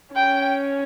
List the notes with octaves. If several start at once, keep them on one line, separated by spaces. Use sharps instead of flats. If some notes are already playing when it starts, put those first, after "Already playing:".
C#4 G5